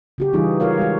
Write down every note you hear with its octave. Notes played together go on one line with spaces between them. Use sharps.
C#3 F#4 G4
E3 G3 D#4 F4 G#4
F4 F#4 A#4 C#5 F5
G#3 F#4